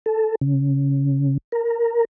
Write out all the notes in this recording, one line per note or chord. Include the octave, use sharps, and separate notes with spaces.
A4
C#3
A#4